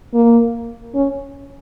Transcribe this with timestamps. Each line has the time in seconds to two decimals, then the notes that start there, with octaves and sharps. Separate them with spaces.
0.14 A#3
0.95 C#4